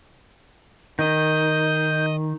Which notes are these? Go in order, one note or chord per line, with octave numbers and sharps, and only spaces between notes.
D#3 D#5 G6